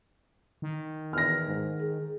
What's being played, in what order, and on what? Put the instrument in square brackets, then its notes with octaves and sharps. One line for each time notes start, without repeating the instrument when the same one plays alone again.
[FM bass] D#3
[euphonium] E2 [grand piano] F6 A#6
[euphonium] G#2
G#4